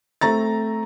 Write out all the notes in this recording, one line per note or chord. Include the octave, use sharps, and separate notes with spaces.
A3 C4 A#5 A6